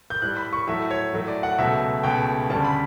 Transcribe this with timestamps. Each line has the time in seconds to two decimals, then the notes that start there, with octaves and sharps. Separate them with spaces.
0.10 G6
0.22 A2 G3 F#6
0.37 B5
0.53 C#6
0.67 A2 F#3 A3 E5
0.91 C#5
1.13 A2 F#3 A3
1.28 D5
1.43 F#5
1.58 C#2 B2 F#3 A3 E5
2.03 C#2 B2 A3 G5
2.50 D2 C#3 G3 A5
2.65 B5